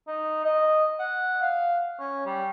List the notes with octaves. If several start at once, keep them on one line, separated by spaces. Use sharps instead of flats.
D#4
D#5
F#5
F5
C#4
G3